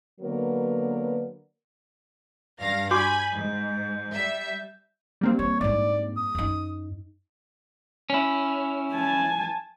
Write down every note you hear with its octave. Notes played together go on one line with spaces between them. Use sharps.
D3 F#3 A#3 B3 A#4 B4
G2 F5 A#6
F#4 G#5 B5 C6 D6 G6
G#2
G3 E5
G3 A#3 C4
E3 C#5
G#2 D4 D5
D#6
F#2 D#4
C#4 E4
G#5 A5